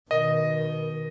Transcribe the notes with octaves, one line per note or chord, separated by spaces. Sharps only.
B2 D#3 A#4 D#5